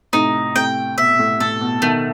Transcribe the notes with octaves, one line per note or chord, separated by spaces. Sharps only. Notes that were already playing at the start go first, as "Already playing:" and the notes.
A2 C3 D#4
A2 C3 G5
B2 E5
A2
A2 A4
B2
B2 D#3 A3